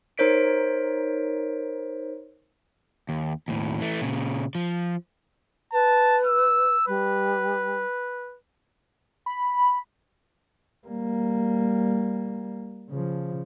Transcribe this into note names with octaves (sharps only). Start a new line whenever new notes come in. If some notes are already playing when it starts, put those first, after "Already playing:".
D#4 A#4 C5 C#5 B6 D7
D#2
D#2 A2
E3 A3
A#2 C#3
F3
B4 A5
E6
G3 B4
B5
G3 A#3
C#3 F3